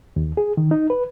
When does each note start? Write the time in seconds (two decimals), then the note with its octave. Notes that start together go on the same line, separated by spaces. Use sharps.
0.16 D#2
0.37 G#4
0.57 D#3
0.71 D#4
0.90 B4